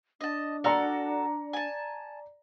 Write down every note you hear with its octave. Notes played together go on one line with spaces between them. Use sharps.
D4 D#5 A5
F#4 A4 D5 A#5 F6 C#7
G#5 A5